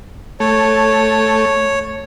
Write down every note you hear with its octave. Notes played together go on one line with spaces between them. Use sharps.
A3 C#5